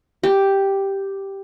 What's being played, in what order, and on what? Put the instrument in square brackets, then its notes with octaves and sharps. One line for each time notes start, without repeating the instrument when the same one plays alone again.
[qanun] G4